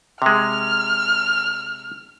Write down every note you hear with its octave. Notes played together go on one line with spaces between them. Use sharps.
C3 G#3 F6